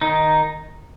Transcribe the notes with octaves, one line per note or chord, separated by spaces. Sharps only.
D#3 D#4